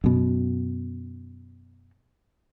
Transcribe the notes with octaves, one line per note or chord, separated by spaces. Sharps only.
F#2 B2